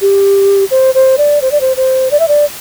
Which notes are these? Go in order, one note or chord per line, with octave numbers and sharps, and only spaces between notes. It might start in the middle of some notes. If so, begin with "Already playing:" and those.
G4
C5
C5
D5
C5
D5
C5
C5
D5
E5
D5